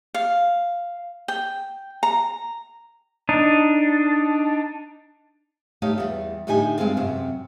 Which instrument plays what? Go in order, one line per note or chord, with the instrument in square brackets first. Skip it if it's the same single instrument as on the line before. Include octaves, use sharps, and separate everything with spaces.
[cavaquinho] F5
G5
A#5
[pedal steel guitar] D4 D#4
[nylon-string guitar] A3 D#4 G4 C#5 D#5 F5
E2 G3
A2 D3 D#4 G4 G5 G#5
G2 G#3 C4 F4 G#4 F5
F#2 C3 C4